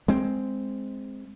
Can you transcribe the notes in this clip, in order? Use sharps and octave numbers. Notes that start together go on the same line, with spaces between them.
G#3 C4